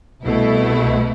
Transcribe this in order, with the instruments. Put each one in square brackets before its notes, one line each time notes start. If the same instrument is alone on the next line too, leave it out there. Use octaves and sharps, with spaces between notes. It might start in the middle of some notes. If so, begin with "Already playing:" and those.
[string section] C2 B2 A3 E4